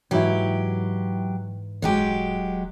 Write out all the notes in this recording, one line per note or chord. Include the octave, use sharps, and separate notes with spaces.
G#2 E3 F#3 E4 G4
D#1 F#3 G#3 G4